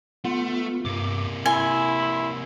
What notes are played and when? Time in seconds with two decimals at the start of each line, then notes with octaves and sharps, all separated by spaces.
0.24 A3 B3 F4
0.85 G2 C3 A#3 D6
1.46 E4 G#5 C6